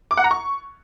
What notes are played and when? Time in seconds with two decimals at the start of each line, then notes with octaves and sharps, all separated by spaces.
0.11 D6
0.17 F#5
0.24 A#5
0.31 C#6